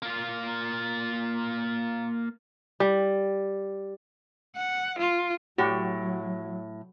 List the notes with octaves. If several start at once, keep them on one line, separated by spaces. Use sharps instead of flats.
A#3 F4
G3
F#5
F4
A2 F#3 F#4 G4